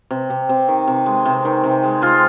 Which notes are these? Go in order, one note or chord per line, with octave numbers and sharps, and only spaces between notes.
C3
C3
C3
D#3
C3
G#3
C3
D#3
C3
G#3
G#3 F4